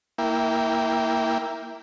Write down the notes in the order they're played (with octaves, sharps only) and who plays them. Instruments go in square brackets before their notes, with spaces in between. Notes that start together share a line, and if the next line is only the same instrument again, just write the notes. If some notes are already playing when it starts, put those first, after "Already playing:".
[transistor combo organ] A#3 E4 G5